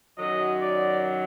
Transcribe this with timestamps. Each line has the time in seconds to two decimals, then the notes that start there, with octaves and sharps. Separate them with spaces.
0.17 F#2 D#3 F#3 D#5
0.61 D5